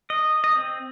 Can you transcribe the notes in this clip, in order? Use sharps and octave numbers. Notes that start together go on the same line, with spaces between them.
D#5
D#5
C4